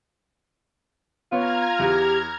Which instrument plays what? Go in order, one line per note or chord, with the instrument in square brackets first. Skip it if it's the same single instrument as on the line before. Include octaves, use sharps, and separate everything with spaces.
[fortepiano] B3 C#5 [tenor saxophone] F4 [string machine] A#5 F6 G#6
[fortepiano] E2 [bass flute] G4